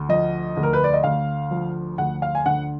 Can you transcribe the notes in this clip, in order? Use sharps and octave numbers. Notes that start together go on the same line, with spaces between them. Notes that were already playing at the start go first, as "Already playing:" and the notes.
Already playing: D2
F3 D#5
D2
A#4
B4
D5
D#5
D2 F5
F3
D2 F#5
F5
G#5
D3 F#5